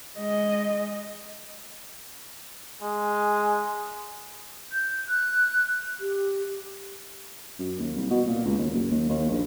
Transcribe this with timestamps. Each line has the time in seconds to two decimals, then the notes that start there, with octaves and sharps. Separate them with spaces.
0.18 G#3 D#5
2.82 G#3
4.72 G6
5.09 F#6
6.00 G4
7.59 F#2
7.79 D#2
7.96 C2
8.10 B2
8.26 A#2
8.45 C#2
8.58 D#2
8.74 F#1
8.91 D#2
9.09 D#2
9.30 A#1